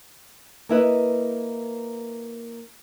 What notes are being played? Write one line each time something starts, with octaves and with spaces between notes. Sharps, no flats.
A#3 E4 B4 D#5